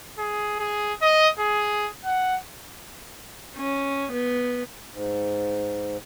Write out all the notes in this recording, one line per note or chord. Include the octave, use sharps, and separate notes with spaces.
G#4
G#4
D#5
G#4
F#5
C#4
B3
G#2